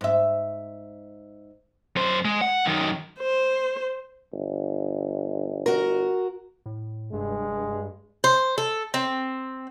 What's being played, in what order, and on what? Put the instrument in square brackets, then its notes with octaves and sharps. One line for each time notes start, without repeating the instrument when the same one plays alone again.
[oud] G#2 E5
[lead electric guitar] F#2 C5
G#3
F#5
F#2 D#3
[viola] C5
[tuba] G1
[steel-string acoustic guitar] F#4 A#4
[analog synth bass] A2
[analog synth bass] F1 [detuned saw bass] G2 [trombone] G#3
[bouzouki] C5
A4
C4